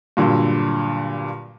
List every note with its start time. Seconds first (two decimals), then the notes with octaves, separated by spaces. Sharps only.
0.17 G2 A#2 D3 F#3